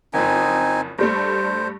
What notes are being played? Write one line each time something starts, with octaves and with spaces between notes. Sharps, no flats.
F#1 F2 C4 D#4 G#5
G2 G3 A3 C5